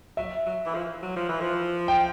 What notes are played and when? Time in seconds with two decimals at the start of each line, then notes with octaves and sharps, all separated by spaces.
0.17 F#3 E5
0.46 F#3
0.65 E3
0.74 F3
1.03 F#3
1.16 F3
1.29 E3
1.41 F3
1.88 G5